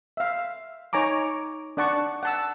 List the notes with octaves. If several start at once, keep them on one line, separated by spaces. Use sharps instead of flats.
E5 F5
D#4 C#5 G#5 A#5 D6
D4 D5 F#5 A5 C#6
F#5 A5 E6